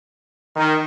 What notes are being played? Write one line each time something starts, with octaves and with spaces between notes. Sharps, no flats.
D#3